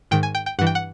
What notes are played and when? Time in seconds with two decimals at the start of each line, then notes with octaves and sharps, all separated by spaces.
0.11 G#2 D#3 G5
0.23 G#5
0.35 G5
0.46 G5
0.59 G2 E3 F#5
0.67 G5
0.75 F#5